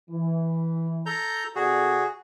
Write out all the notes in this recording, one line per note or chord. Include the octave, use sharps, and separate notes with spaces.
E3
A4 A#5 G6
C3 F#4 G#4 A4 D5